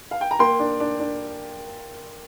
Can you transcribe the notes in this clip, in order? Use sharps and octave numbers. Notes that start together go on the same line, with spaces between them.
F5
G5
A#5
A#3 G5 C6
D4
D4
D4